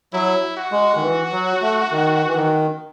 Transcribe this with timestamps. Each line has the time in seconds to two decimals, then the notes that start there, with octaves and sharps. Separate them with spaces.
0.13 F#3 E4
0.57 F#4
0.72 G#3
0.96 D#3
1.02 E3
1.32 F#3
1.62 A3
1.91 D#3
2.27 E3
2.36 D#3